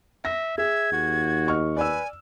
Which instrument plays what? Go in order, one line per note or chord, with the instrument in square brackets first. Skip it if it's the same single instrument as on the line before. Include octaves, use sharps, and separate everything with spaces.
[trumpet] E5 [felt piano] A#6
[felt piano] G#4 [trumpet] E5 [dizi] G#6
[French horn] D#2 [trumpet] F#4
[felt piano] D#5 C#6 F6
[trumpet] B4 [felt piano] D5 E6 [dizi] G#5